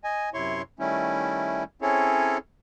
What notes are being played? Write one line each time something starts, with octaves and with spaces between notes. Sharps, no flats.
D#5 G#5
F#2 C3 E4 C#5 C6 C#6
D#3 G3 A3 C#4 E4
C4 C#4 E4 G#4 A4 C#5